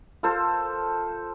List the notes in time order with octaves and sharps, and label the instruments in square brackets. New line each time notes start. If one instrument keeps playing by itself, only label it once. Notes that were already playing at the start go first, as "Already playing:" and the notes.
[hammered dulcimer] F4 A4 C5